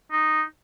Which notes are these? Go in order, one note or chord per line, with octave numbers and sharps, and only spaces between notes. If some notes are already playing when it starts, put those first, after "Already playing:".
D#4